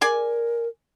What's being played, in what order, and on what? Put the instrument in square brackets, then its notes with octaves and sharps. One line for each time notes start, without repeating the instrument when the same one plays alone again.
[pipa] G#4 D5 G#5 [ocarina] A#4